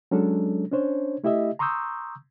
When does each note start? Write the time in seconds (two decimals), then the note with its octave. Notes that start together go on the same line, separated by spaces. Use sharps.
0.11 F#3 G#3 C#4 D4 A4
0.72 C#4 D4 C5 C#5
1.24 A3 E4 G4 D#5 E5
1.59 A#5 C6 C#6 D#6 E6 G6